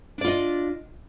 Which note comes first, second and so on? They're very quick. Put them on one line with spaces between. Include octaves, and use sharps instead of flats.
D4 D5 F4 D#5